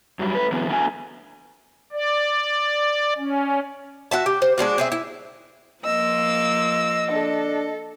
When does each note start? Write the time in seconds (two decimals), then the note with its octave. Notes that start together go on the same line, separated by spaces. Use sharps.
0.19 F#2 F#3 G3
0.35 A3 B4
0.52 D3 E3 F#3 B3
0.69 A3 B3 D4 F#4 E5 G#5
1.92 D5
3.18 C#4
4.11 F#4 E5 A5
4.26 G4
4.42 C5
4.58 G#3 D4 F4 F#4
4.78 C4 G#4 E5
4.92 E4
5.84 F3 A#3 F4 D#5 E6
7.10 D4 A4